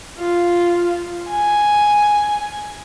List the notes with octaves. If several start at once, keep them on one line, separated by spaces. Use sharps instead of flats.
F4
G#5